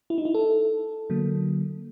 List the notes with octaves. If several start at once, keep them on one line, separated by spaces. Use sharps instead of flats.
E4
D#4
E4
A4
D3 F#3 A#3